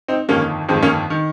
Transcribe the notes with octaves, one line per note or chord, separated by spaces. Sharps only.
C4 D#4
G1 F2 D#3 A#3 C#4
G1 F2 D#3 G#3 C4
A#3 C#4
D#3